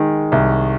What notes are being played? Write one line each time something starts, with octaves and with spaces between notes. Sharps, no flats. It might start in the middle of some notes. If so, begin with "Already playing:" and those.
Already playing: D#3 G#3
C2